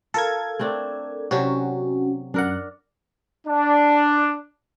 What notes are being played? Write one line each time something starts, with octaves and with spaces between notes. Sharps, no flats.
F4 A4 A#4 G#6
A3 C4 D4
C3 F#3 C#4 F#4 E5
F#2 D4 A#4 F#5
D4